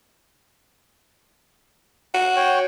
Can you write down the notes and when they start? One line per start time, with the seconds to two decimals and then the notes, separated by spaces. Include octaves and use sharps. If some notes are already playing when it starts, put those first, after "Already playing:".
2.14 F#4
2.36 C#5 G5